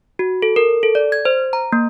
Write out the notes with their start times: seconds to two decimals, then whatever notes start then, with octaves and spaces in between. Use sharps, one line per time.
0.19 F#4
0.42 A4
0.56 A#4
0.83 A4
0.95 D5
1.12 G#6
1.25 C5
1.53 A#5
1.72 A#3